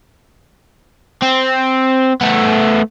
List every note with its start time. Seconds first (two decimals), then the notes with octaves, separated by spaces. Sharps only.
1.22 C4
2.21 A3 B3